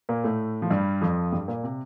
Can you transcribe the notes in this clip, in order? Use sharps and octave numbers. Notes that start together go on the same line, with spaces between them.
A#2 A#3
A2 A3
F3
G2 G3
F2 F3
G2 G3
A#2 A#3
C3